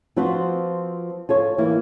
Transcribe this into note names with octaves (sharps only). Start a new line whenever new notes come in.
F3 C4 F4 F#4 B4 C5
F4 A4 C#5
E3 A#3 E4